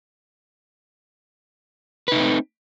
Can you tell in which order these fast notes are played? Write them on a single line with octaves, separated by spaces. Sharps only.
B4 D#4 A3 C4